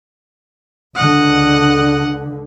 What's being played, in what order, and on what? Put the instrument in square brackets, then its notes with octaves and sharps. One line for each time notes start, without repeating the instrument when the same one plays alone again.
[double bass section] C#2 D3 [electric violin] D#5 F#5